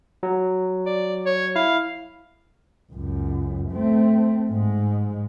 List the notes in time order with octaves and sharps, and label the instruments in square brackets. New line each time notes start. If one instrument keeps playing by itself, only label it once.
[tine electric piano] F#3
[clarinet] D5
C#5
[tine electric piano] E4 [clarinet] F5
[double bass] C#2 F#2
A3 C4
G#2 G#3